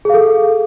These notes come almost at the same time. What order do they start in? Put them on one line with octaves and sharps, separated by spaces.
G#4 F5 A4